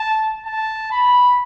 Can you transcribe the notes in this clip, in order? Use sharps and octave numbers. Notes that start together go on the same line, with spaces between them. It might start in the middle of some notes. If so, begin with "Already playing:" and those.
Already playing: A5
A5
B5